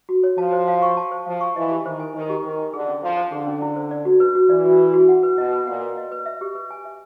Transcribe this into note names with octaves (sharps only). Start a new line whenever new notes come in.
F#4
C#5
F3 A5
C5
F5
C#6
A5
C5
F3 F5
C#6
E3 D#5
G4
D#3 C5
G#5
D#3 D#5
G4
D#3 C5
G#5
D3 G#4
C#4
F3 E4
C5
D3 G#4
C#4
E4
C5
D5
F#4
B4
F#4
E3 D5
F#4
B4
F#4
F#5
B4
B2 D#5
B4
A#2 F#5
B4
D#5
B4
E5
G4
B4
G#5
E5